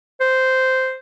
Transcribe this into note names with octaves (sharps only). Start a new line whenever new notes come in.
C5